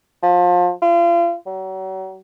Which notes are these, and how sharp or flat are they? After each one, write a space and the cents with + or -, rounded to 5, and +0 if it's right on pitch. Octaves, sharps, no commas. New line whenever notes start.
F3 +30
F4 -35
F#3 +40